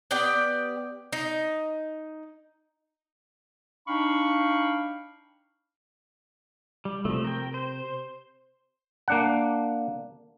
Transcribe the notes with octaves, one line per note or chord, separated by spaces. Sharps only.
B3 G4 D5 G5
D#4
D4 D#4 F5 G5 B5 C#6
G3
C3 F3 A3
A#4 G5
C5
A#3 D4 F#5